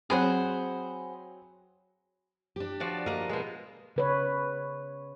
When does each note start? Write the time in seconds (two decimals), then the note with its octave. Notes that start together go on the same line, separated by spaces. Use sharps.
0.10 F#3 C4 G#4 C5 F#5 B5
2.56 D4 G4
2.80 F3 F#4 D5
3.06 A#3 A#4 D#5
3.29 B2 G#3
3.96 C#3 B4 C#5